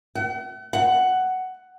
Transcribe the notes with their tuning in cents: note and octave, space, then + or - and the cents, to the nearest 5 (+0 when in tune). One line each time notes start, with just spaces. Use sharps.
F#5 +40
F#5 +10